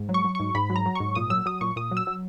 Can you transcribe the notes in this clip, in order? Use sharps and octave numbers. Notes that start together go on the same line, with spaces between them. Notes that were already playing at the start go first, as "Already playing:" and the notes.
Already playing: G#2
F#3
C#6
F#3
G#2 C#6
G#2 B5
F#3
A#5
F#3
G#2 C#6
A#2 D#6
F#3 E6
F#3 D#6
A#2 C#6
A#2 D#6
F#3
E6
F#3